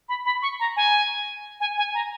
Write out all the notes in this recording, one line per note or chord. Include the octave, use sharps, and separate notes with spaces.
B5
B5
C#6
A#5
G#5
G#5
G#5
A#5